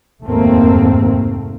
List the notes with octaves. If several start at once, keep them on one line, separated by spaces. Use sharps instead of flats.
F1 D#2 G#2 A3 A#3 C4